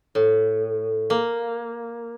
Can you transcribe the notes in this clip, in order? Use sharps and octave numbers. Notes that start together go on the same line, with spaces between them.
A2
A#3